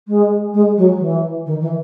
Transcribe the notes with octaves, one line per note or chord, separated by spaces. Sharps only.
G#3
G#3
F#3
E3
D#3
E3